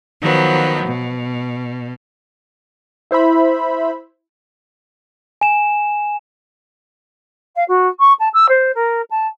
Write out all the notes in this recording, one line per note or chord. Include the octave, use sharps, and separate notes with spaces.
D#3 F3 F#3 B3
B2
E4 C5 E5 B5
G#5 E7
F5
F#4
C#6
A5
E6
C5
A#4
A5